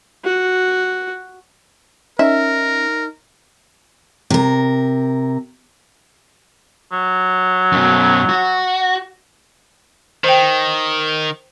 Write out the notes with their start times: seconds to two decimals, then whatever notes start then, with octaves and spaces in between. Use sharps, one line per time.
0.24 F#4
2.19 C#4 D#4 A#4 E5
4.30 C3 A#4
6.92 F#3
7.72 F#2 B2
8.29 F#4
10.24 D#3 C5 G5